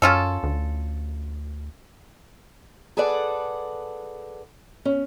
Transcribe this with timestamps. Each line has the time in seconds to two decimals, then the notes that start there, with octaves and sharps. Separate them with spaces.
0.02 F#2 C#4 F4 A4
0.43 D2
2.97 G#4 A4 B4 D5 F#5
4.85 C#4